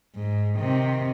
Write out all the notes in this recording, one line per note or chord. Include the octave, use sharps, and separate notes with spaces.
G#2
C3 D#3